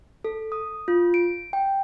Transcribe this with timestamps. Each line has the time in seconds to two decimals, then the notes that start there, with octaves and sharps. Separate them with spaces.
0.25 A4
0.52 D#6
0.88 F4
1.14 D7
1.53 G5